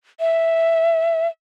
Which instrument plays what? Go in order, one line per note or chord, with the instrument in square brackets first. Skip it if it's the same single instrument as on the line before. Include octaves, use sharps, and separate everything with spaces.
[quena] E5